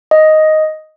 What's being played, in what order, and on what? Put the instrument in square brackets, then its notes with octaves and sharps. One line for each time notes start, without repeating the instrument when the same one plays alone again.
[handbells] D#5